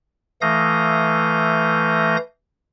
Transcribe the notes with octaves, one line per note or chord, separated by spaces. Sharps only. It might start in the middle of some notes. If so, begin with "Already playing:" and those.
E3 A3 F5 D#6 G6 A#6